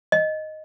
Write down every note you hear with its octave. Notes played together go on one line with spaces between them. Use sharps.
D#5